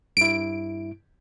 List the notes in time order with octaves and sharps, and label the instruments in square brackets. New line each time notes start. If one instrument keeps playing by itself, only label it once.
[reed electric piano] G2 E4 [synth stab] D7